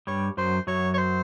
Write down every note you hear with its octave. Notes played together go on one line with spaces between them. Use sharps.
G2 G3 C#5
F#2 F#3 C5
F#2 F#3 C#5
C#5
C5